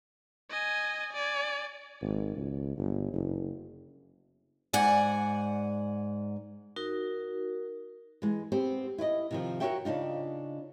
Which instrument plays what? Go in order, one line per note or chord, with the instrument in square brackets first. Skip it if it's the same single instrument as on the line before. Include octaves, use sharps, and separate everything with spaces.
[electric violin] D#5 G#5
D5 G#5
[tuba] G#1
C#2
G1
F#1
[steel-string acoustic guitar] G#2 D5 F#5 G#5
[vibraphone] D#4 F#4 A#4
[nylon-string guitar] E3 G#3
B3 C4 G4 C5
E4 B4 D5 D#5
C3 D#3 F3
F#4 A4 A#4 C#5 E5 G5
C#3 D4 D#4 F4